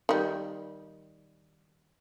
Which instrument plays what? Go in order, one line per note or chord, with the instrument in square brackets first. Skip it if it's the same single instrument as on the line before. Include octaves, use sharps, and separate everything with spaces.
[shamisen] D#3 G3